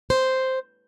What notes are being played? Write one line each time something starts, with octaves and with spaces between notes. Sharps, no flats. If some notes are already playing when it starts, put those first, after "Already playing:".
C5